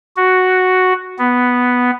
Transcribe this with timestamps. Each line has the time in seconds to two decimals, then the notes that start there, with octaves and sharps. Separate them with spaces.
0.17 F#4
1.18 B3